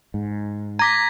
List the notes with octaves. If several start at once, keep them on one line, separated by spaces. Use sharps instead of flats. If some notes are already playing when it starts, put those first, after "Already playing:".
G#2
A#5 D6 G#6 A#6 B6